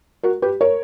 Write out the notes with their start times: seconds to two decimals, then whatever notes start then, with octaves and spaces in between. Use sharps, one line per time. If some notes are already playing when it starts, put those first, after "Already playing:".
0.23 F#4 A#4
0.42 G4 B4
0.61 A#4 C#5